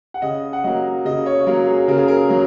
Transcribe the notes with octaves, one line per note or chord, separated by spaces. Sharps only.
F#5
C#3 D#5
F#5
F#3 A#3 D#5
C#3 D#5
C#5
C#5
F#3 A#3 A#4
G#4
C#3 A#4
G#4
A#4
F#3 A#3